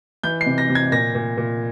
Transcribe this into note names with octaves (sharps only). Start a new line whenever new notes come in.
E3 G6
C7
C3
A#6
C3
G#6
A#2 A#6
A#2
A#2